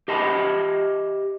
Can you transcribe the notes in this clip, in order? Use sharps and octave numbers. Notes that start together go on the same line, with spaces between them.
G4 D#5 E5 A5 B5